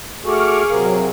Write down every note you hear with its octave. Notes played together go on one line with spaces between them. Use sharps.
A3 F#4 G#4 A4 C#6 D6 F6
C3 F#3 A#4 F5